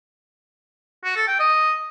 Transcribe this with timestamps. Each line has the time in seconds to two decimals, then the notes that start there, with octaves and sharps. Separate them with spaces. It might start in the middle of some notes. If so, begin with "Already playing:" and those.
1.05 F#4
1.16 A4
1.28 G5
1.40 D#5